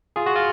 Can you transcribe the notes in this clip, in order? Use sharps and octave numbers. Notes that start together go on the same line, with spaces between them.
F4 G#4
F#4
F4